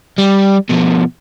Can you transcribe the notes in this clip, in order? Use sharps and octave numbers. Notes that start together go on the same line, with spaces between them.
G3
B2 F3